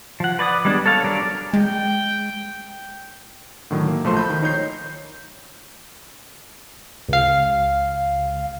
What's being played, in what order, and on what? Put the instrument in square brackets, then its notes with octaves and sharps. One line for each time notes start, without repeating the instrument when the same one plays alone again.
[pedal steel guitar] F3 F#5
B4 D5 G#5 D#6
G3 G#3 B3 D4
A4 C#5 F5 A5
F#3 G3 D4 A#4 D5
[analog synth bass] G#3 [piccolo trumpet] G5
[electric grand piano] A2 D3 D#3 F#3
A#3
B1 F3 A3 C5 C6
B5 G6
D#3
D#4 C#5 G6 C7
[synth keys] C#2 F5